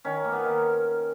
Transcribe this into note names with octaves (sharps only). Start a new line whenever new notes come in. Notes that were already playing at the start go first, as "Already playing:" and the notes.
D#3 C#4
A#3
B3
D#3